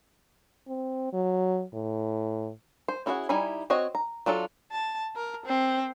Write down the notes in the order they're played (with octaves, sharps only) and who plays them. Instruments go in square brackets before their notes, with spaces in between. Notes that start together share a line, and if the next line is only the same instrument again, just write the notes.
[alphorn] C4
F#3
A2
[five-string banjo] C5
C#4 E4 F#4 G#4 F#5
G3 D#4 E4 G#5 B5
C4 F#4 C#5 D#5
A#5
F#3 D4 F4 A4
[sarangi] A5
A#4
C4